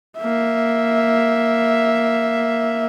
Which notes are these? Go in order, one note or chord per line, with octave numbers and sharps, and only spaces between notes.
A#3 E5